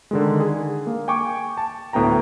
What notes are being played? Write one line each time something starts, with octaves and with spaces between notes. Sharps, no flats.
D3 D#3 G#3
G#4
A#3
G5 G#5 C#6 D6
A5
D2 A2 B3 G5 A#5